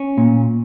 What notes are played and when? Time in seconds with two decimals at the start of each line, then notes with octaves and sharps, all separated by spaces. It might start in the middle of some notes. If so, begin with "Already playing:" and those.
Already playing: C#4
0.18 A#2